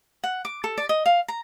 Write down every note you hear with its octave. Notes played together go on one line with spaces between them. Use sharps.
F#5
D6
A4
D5
D#5
F5
A#5